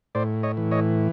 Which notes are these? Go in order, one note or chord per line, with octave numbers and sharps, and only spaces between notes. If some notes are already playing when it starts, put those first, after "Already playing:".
A2 C5 D5
C#5 D#5
E3
C#5 D#5